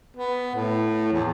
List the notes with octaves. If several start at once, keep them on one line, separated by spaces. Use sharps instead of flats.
B3
A2
E2